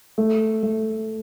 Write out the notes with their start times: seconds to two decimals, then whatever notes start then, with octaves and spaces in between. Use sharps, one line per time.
0.18 A3
0.63 A3